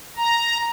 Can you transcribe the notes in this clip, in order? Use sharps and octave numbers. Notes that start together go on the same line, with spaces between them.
A#5